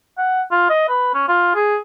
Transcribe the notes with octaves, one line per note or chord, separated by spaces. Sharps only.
F#5
F4
D#5
B4
C#4
F4
G#4